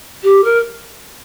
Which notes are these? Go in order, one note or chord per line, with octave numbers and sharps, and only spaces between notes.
G4
A#4